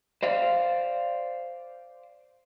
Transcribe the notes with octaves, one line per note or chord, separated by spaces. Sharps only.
C5 D5 F5